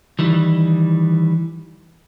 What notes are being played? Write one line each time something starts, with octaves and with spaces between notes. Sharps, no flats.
D#3 E3 G3